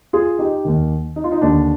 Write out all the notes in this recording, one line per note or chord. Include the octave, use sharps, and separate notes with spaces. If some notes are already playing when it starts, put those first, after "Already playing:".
F4 G#4
D#4 G4
D#2 D#3
D#4
F4
D#4
D#2 D3 D4